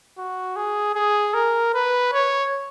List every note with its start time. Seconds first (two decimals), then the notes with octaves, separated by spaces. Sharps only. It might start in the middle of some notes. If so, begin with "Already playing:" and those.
0.18 F#4
0.56 G#4
0.96 G#4
1.34 A#4
1.74 B4
2.13 C#5